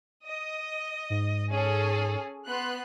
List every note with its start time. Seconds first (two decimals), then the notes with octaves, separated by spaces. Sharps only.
0.25 D#5
1.10 G#2
1.51 C#4 G#4 A4
2.47 B3 C6 F#6